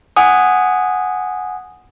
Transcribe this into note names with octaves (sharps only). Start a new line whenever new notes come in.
F#5 G#5 D#6